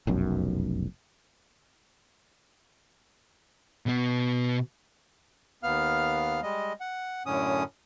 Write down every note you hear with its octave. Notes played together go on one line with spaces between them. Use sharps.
F1 B1 F#2
B2 B3
D#2 B3 F5 F6
G3 G#3 D#5
F#5
F#2 A2 D3 C#4 D#6